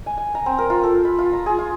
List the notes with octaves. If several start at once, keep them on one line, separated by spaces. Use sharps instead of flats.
G#5
G#5
A#5
C4
A#4
F4
A4
B5
F4
A#5
G#4
F4